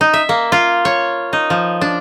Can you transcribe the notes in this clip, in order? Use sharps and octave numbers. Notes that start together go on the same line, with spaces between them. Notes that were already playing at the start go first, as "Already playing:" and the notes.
D#4
E5
A#3
F4
C#5
D#4
F3
D4